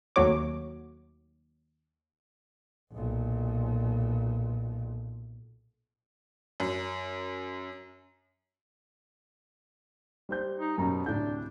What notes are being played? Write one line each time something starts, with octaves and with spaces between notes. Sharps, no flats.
D#2 F#3 A3 F#4 C#5 D6
B1 A#2
F#2
G3 C5 G6
D#4
F#2 B2 A#5
D2 A2 C3 D4 G6